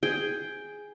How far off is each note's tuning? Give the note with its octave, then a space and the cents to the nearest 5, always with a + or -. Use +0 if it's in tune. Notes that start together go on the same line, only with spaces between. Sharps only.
G#4 +0 G5 +0